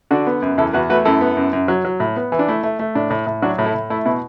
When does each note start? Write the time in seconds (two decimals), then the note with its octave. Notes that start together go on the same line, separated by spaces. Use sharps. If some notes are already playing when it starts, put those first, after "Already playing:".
0.11 D3 D4 F#4
0.27 B3
0.42 F#2
0.58 E2 E4 A4
0.73 E2 F#4 B4
0.90 A3 F#4 B4
1.05 F#2 E4 A4
1.21 B3
1.37 F#2
1.53 F#2
1.68 F#3
1.85 F#3
2.00 A2
2.17 B3
2.32 E3
2.39 D4
2.48 A3 E4
2.64 A3
2.79 A3
2.95 A2 D4
3.10 A2
3.27 A2
3.42 F#3 D4 F#4
3.58 A2
3.66 E4 A4
3.74 A2
3.90 A3 E4
4.06 B2 E4